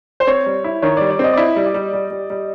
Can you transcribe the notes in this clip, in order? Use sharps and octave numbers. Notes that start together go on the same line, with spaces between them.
C5
C4 C#5
G3
E4
D#3 C#5
G3 D5
D5
C4 D#5
D5
E4 D#5
G3
D5
G3
G3
G3
G3